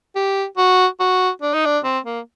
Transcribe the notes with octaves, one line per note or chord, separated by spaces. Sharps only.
G4
F#4
F#4
D4
D#4
D4
C4
A#3